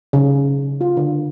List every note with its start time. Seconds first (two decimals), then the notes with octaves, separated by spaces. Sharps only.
0.13 C#3
0.81 F4
0.97 D3